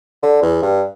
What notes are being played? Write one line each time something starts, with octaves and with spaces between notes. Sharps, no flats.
D3
E2
G2